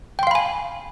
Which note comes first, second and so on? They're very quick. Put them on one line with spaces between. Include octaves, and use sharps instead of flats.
G5 C6 F5 B5 G#5